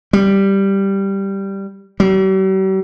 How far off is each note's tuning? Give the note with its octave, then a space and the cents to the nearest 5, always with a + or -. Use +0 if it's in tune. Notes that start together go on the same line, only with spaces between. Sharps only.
G3 +0
G3 -45